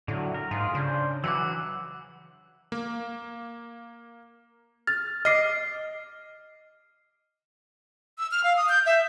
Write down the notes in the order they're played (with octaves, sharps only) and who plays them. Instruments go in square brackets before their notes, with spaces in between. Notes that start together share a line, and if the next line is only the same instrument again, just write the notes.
[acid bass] A2 [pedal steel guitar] D3 F#3
[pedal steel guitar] A#4
[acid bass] G#2 [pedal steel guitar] F4 G#4 A#4
[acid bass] C#3 [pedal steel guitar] D4 C5
[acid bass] E3 [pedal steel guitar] F#3 F#5 F#6 [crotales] D6 E6
[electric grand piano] A#3
[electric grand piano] F6 [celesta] A6
[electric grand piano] D#5 D6 [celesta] F6 C7
[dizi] E6
F6
F5
D#6
G6
E5